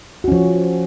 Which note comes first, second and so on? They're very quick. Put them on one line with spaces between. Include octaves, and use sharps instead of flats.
F#4 C#4 F3